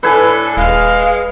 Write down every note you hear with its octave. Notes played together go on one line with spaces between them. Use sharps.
A2 D4 A4 B4 G#5
D#1 G#3 F5